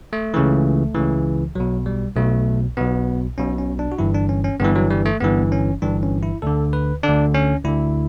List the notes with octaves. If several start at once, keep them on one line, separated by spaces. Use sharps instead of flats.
A3
C#2 C#3 E3
C#2 C#3 E3
B1 B2 F#3
G3
B1 B2 A3
B1 B2 B3
B1 B2 C#4
C#4
D4
F#4
G1 G2 E3 E4
D4
C#4
C#4
G1 G2 E3 B3
F#3
G3
A3
G1 G2 E3 B3
C#4
G1 G2 E3 D4
C#4
E4
D2 D3 A4
B4
D2 D3 D4
C#4
D2 D3 E4